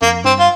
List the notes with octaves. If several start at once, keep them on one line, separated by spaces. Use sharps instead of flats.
F2 A#3
G2 C4
F4